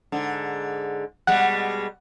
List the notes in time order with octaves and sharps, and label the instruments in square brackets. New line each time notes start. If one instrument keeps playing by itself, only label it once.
[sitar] G#2 D3
[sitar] B2 G3 G#3 [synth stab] F#5